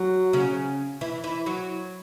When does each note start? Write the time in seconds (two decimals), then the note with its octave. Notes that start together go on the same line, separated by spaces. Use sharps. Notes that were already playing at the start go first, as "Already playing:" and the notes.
Already playing: F#3
0.33 C#3 C#4
1.01 E3 E4
1.24 E3 E4
1.46 F#3 F#4